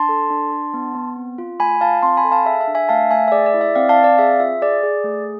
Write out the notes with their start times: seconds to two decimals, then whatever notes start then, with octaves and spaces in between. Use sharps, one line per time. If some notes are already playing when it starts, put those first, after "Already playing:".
Already playing: D4 A5 C6
0.09 A4
0.30 D4
0.52 D4
0.74 B3
0.95 B3
1.16 C4
1.38 F4
1.59 A3 G#5 B5
1.81 F4 F5 A5
2.03 C4 A5 C6
2.17 G#5 B5
2.24 A4
2.31 F5 A5
2.45 G#4 E5
2.61 E5
2.67 D4
2.75 E5 G#5
2.89 A3 F5 A5
3.10 A3 E5 G#5
3.28 E5
3.32 G#4 D5
3.46 D5
3.54 E4
3.61 E5
3.75 C4 D5 F5
3.89 F5 A5
3.97 C4
4.03 D5 F5
4.18 G#4 E5
4.40 F4 E5
4.62 G#4 D5
4.83 G#4
5.04 A3